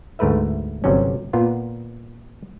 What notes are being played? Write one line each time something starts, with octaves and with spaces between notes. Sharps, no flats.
D2 G#2 A3 A#4 B4 E5
G1 C3 F#3 G3 C#4
A#2 B3 F4